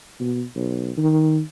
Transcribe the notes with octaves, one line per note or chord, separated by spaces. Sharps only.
B2
B1
D#3